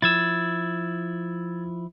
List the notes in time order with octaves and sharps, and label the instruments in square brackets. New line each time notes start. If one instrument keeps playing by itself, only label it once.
[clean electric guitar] F3 E4 [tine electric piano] E6 G#6 A6